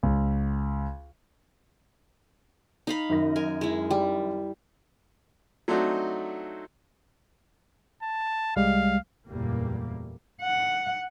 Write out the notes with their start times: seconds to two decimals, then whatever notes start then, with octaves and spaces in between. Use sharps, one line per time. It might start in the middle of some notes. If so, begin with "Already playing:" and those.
0.03 C#2
2.87 D#4 F5 B5
3.10 F#2 D#3 A#6
3.36 A#4 G#5
3.61 G#3 E4
3.91 G3
5.68 F#3 A3 C4 D4 D#4 F#4
8.03 A5
8.56 C2 G3 G#3 F5
9.28 F#1 E2 A#2 G3 A3 A#3
10.42 F#5